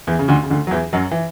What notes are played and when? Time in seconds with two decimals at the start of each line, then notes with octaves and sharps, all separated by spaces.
0.07 E2 E3
0.19 C#3
0.28 D2 D3
0.43 C#3
0.50 D2 D3
0.67 F#3
0.71 E2 E3
0.93 F#2 F#3
1.11 E3